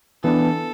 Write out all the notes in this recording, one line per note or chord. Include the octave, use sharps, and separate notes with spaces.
E3 B3 D4 A4